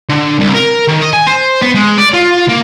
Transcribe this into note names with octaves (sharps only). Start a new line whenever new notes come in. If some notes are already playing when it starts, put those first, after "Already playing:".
D3
C2
A#4
D#3
D#5
G#5
C5
B3
G#3
D5
F4
A#3